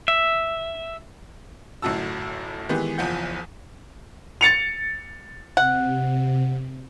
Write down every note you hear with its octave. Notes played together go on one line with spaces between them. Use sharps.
E5
G1 F#2 A2 F#4 A5 E6
D#3 E3 G#3 B3 G4
F#1 E2 F3 F#5 G6
A6 C#7 F7
C3 F#5